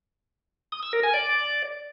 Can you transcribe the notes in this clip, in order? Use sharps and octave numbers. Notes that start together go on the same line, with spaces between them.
D#6
E6
A#4
G#5
D5